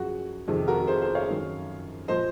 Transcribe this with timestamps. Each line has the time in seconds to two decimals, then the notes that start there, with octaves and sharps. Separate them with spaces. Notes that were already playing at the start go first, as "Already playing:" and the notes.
Already playing: F#2 F3 F#4 G#4
0.48 F2 C3 D#3 G#4
0.68 F#4 A#4
0.87 G#4 C5
1.02 G#4 C5
1.15 C#5 F5
1.29 F#2 D#3
2.08 A#2 F3 C5 D#5